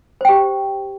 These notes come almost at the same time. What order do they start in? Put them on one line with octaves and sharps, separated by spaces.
C5 G5 G4